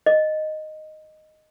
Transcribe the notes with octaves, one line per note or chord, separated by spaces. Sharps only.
D#5